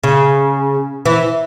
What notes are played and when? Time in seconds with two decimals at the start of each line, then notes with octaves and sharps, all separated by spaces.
0.03 C#3
1.05 E3